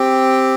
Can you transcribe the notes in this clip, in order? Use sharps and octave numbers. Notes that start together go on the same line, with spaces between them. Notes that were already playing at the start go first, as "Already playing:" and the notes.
Already playing: C4 G4